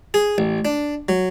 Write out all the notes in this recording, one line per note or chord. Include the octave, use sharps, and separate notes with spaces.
G#4
A1
D4
F#3